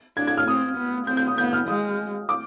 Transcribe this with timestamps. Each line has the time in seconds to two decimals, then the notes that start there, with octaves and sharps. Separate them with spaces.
0.17 D4 G#6
0.27 G#6
0.37 F6
0.48 C4 D#6
0.77 B3
1.07 C4 G6
1.17 G6
1.27 D#6
1.38 B3 G6
1.53 F6
1.68 G#3 D#6
2.29 D6